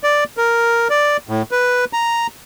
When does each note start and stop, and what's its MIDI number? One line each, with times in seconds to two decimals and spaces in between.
0.04 0.24 74
0.37 0.88 70
0.90 1.17 74
1.29 1.42 45
1.51 1.85 71
1.93 2.27 82